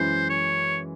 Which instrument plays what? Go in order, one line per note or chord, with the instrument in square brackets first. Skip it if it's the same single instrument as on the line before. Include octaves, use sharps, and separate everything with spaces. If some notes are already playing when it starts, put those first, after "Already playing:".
Already playing: [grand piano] F#2 E3 G#3 C#4 E4 [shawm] C5
[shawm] C#5